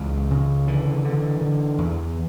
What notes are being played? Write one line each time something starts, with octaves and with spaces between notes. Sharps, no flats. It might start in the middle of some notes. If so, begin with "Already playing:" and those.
Already playing: C#2 C#3 E3
C#3
D3 E3
D3
D3
E2